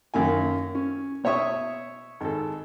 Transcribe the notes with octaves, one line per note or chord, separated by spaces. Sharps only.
F#2 D#3 A#3 G#5
C#4
B2 C#5 E5 C#6 D#6
G#1 A4